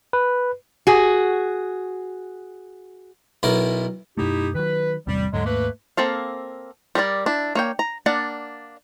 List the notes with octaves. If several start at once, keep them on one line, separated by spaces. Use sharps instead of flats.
B4
F#4 G#4
B1 B2 E4 A#4
F#2 B2 A3 D#4 E4 G4
D#3 F#3 B4
A1 E2 C3 G3
D#2 G#2 D3 F#3 G#3
A3 A#3 B4
A#3 C4 A4 F5
G3 A#4 B4 D5
D4 E4
A#3 C#5 G5
A#5
A#3 D4 D5 F#5